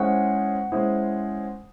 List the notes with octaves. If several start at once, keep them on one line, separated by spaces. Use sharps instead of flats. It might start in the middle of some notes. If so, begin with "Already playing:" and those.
Already playing: G#3 C#4 E4 G#4 C5 F#5
G#3 C#4 E4 G#4 C5